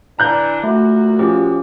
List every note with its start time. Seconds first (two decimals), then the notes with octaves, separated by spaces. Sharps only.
0.19 D3 E3 D4 A#5 F#6 G6
0.63 A#2 A3 F#4
1.19 F3 C#4 G4